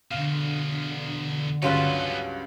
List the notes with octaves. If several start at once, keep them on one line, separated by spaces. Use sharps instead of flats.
E2 B2 D3 F5
C#2 G2 F#3 B3 F4 A4 B4